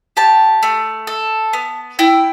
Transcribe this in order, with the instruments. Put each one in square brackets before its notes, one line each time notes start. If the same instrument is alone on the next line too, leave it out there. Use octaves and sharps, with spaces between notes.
[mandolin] G4 A5
A3
A4
B3
E4 G5